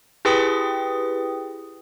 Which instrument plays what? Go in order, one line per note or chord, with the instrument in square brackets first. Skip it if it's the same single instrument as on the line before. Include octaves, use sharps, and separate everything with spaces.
[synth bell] E4 G4 G#4 B4 G5 D#6